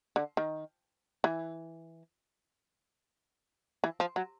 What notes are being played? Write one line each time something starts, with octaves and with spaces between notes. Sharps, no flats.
D3
D#3
E3
E3
F3
F#3